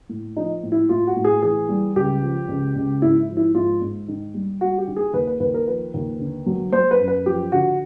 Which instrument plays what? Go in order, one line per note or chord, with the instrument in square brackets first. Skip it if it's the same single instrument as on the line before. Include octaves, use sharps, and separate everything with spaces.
[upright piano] A2
F3 D#4
A2
E4
A2 F4
F#4
A2
G#4
E3 G#4
G3
C#2 G4
F3
C#2
C#2
G#2 E4
F3
E4
G#2 F4
G#2
D#3
G3
G3 F#4
G4
D#3
G#4
D#2 B4
B4
D#2 B4
A#4
F3 B4
D#2
D3
F#3
F#3 C5
B4
F#2
B4
F3 G4
D3 F#4